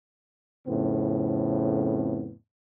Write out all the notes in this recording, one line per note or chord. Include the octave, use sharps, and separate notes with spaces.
F2 A2 C#3 B3 C4